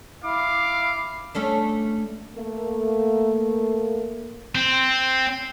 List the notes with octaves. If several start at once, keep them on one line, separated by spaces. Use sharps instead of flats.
E4 F5 D6
A3 C#4 D4
A3 A#3
C4